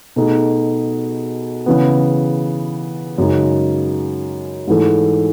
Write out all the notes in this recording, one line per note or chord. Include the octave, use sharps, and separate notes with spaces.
B2 A3 D#4 G#4
C#3 E3 B3
F#2 C#3 G#3 D#4
G#2 E3 A3